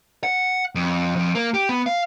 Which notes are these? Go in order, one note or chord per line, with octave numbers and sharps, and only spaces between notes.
F#5
F2
F2
A#3
G4
B3
F5